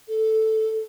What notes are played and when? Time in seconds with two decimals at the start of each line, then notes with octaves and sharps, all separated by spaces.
0.08 A4